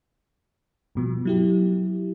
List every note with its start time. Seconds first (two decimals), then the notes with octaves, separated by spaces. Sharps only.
0.95 G2 B2 F3
1.25 F#3 E4 G4